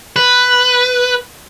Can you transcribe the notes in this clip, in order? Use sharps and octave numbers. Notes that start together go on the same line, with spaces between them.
B4